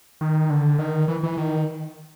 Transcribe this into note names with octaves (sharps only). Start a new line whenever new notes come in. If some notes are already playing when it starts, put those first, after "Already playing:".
D#3
D3
D#3
E3
E3
D#3